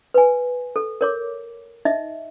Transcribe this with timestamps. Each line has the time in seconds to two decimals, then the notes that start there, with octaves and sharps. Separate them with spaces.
0.14 B4 G#5
0.76 A4
1.01 A#4 C#5 D6
1.85 D#4 D#5 E5